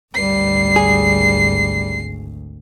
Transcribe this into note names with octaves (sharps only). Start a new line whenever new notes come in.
G#1 D2 G3 C7
G#4